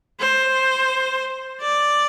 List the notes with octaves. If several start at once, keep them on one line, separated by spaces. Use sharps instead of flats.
C5
D5